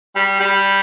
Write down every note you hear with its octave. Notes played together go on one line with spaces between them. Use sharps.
G3
G3